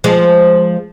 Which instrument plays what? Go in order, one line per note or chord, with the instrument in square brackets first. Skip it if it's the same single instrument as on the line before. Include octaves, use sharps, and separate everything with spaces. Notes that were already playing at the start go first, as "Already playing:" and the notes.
[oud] F3 G#3